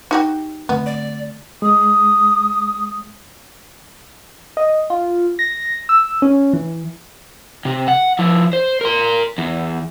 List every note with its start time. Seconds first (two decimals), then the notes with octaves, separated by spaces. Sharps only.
0.11 D#4 F#4 G4
0.69 D3 A3 B3 C4
0.86 D5
1.62 G#3 D#6
4.57 D#5
4.90 F4
5.39 A#6
5.89 E6
6.22 C#4
6.53 E3
7.65 C3
7.88 F#5
8.19 F3 E4
8.53 C5
8.81 A#4 C6
9.38 E2